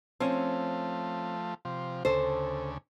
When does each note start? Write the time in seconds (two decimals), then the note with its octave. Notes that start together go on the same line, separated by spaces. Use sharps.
0.20 F3 A3 C4 C#4
1.65 C3 F3
2.05 D2 C#3 A4 C5